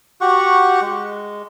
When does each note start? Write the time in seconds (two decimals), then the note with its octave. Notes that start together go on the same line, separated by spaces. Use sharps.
0.21 F#4 G4 F#5 C#6
0.82 G#3